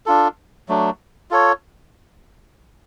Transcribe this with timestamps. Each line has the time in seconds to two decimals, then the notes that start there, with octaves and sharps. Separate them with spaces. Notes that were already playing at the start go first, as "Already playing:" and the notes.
0.06 D4 F4 A4
0.68 F#3 A3 D4
1.31 F4 A4 C#5